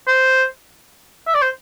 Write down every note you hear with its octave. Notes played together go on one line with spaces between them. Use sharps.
C5
E5
D5
C5